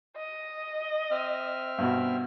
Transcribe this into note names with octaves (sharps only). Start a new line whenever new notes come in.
D#5
C4 E5 F6
G2 B2 F#4